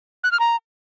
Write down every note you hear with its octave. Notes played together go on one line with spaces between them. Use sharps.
F#6
F6
A#5